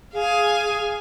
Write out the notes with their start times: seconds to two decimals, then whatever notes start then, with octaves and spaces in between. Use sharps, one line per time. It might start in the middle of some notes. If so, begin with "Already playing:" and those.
0.14 G#4 F5 G#5